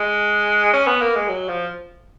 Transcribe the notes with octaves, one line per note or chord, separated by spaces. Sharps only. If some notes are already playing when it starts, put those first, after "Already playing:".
Already playing: G#3
C#4
B3
A#3
G#3
F#3
F3